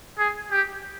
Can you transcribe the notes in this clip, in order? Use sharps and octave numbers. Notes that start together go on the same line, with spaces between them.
G#4
G4